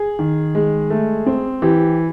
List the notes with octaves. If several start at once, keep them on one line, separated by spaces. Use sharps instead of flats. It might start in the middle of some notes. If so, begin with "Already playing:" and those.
Already playing: G#4
D#3
G#3
A3
C4
E3 G4